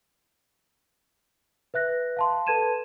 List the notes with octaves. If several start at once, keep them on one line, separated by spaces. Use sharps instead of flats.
B4 E5 F#6 A#6
F5 A5 C6
A4 B4 A5 G#6 D#7 E7